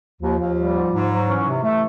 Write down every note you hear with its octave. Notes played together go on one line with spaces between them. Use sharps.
D#2 F3
D#2
G3
G#2
G#2
F#3
E3 C#4
C3
A3